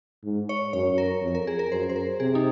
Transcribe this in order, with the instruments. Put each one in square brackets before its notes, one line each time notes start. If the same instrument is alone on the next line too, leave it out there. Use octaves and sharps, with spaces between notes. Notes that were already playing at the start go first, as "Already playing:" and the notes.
[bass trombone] G#2
[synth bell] C#5
[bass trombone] F#2 [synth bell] C#5
[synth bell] A#4
[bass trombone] F2
[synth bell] A#4
G#4
A#4
[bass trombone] F#2 [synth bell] C5
[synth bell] C5
A#4
[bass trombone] C3 [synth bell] G#4
[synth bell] D#4